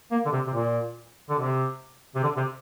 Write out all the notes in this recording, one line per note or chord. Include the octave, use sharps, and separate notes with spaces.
A#3
D3
C3
C3
A#2
D3
C3
C3
D3
C3